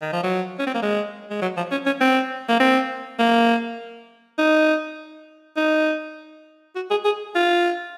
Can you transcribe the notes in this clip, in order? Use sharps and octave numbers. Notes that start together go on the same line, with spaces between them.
D#3
F3
F#3
C#4
C4
A#3
G#3
G#3
F#3
F3
C#4
C#4
C4
A#3
C4
A#3
D#4
D#4
F#4
G#4
G#4
F4